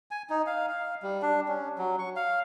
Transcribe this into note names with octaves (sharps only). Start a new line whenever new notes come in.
G#5
D#4
F5
F5
G3
D4
C#4
F#3
C#6
F5